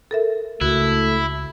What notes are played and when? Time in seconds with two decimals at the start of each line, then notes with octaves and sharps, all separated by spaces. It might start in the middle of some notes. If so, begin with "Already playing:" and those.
0.11 A4 A#4 E5
0.61 C#2 A3 E4 F#4